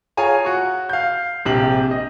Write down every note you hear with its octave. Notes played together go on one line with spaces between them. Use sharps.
F4 G#4 C#5 G#5 A#5
F#4 C#6
F5 G6
A#1 C3 G4 F#7
D#5